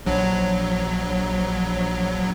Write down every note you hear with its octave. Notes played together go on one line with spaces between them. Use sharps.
A#1 F#3